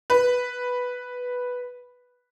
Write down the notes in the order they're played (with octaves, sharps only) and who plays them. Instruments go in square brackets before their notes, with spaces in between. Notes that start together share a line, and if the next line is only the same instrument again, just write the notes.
[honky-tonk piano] B4